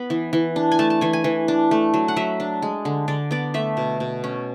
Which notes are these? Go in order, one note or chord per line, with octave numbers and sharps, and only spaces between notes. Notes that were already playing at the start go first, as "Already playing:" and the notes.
Already playing: B3 B5
E3
E3
D4
G#5
A3 A5
A5
E3 G#5
G#5
E3
D4
A3
F#3
F#5
F#3 E5
D4
G#3
D3
D3 D5
B3 D5
A3 E5
B2
B2
C#4